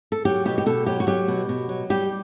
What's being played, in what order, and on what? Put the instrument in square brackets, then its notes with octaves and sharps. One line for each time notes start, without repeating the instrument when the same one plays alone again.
[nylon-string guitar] A4
F#3 G4
B2 G4
G4
B2 A4
F#3 G4
F#4
F#3 G4
B2
B2
F#3
G3 G4